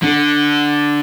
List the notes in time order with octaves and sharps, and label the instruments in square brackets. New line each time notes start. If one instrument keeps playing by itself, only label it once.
[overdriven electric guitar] D3